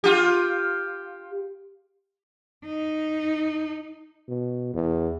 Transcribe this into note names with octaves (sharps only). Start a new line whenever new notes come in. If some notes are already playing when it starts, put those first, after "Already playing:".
F4 G4
D#4
B2
E2